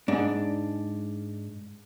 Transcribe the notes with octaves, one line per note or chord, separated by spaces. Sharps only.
G#2 D4